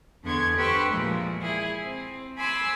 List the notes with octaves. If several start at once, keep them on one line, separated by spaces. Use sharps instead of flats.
E2 D3 B3 C6 C#6 G#6
G4 B4 C5 C6 C#6 E6
A#2 E3 F3 G#3
E4 G#4
C4
G#5 B5 C6 D6 E6